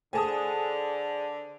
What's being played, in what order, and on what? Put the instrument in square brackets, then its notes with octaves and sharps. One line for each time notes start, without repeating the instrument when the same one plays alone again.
[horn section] D3 [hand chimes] G#4 A4 C5 [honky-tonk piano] G#5 A5 D#6